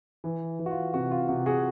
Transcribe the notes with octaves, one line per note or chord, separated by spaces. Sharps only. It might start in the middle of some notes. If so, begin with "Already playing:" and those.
E3
E3
F#4
F4
C3 F#4
F4
C3 F#4
F#4 G#4